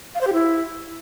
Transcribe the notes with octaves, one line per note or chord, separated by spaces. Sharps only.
F5
C5
G4
E4